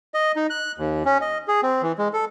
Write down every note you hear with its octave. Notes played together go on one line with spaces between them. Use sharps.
D#5
D#4
F#6
D#2
C#4
D#5
G#4
C4
E3
G#3
A4